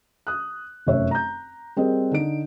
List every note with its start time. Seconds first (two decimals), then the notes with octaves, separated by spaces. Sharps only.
0.27 D#6 F#6
0.87 F1 F#2 C#5 E5
1.11 A#5 G6
1.76 G3 C4 G#4 A#4 D#5
2.11 D3 D#4 D7